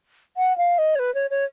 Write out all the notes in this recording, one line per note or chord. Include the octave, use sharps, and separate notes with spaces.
F#5
F5
D#5
C#5
B4
C#5
C#5